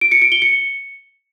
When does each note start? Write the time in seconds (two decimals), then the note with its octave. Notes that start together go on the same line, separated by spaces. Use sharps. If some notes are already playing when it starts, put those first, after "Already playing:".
0.01 D7
0.12 C#7
0.22 D7
0.32 G7
0.42 C#7